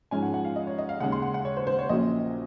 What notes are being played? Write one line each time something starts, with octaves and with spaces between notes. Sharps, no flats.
G#2 F3 G#3 C#4 G#5
F#5
F#5
F5
D#5
C#5
D#5
F5
D#2 C#3 G#3 C#4 F#5
C6
F#5
F#5
C#5
C5
C5
C#5
A#1 A#2 F#3 C#4 D#5